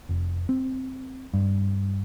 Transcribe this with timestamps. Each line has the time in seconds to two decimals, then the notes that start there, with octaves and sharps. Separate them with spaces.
0.09 F1
0.49 C4
1.34 G2